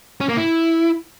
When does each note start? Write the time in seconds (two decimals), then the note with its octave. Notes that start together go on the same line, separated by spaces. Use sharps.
0.21 C#4
0.29 A#3
0.37 E4